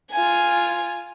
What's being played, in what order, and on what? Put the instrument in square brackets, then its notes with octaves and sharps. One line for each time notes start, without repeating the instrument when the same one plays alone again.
[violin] F4 G#5